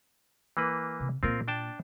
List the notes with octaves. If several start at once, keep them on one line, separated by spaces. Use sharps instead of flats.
E3 A#3 B4
C3
A#2 A#3 C4 F4 A#4
D4 G5 A5